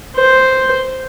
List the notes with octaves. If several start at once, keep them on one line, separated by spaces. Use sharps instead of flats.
C5